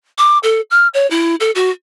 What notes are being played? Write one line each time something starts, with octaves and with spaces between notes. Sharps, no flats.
D6
A4
F6
C#5
E4
A4
F#4